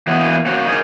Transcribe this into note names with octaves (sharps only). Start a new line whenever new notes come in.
E3 F#3 A#3 B3 B4 D#5
A#3 F#4 C#5
D#4 G#4 A#4